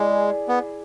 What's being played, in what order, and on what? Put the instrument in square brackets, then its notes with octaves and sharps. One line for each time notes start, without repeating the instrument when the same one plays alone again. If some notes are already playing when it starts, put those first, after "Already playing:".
Already playing: [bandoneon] G#3 [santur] E4 G#4 D5
[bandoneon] B3